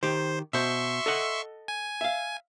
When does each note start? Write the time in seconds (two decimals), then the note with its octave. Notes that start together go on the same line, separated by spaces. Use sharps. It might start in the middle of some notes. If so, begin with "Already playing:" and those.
0.03 D#3 G4 C5
0.53 B2 C5 E5 C6 C#6
1.06 A4 D#5 F#5
1.68 G#5
2.01 E5 F5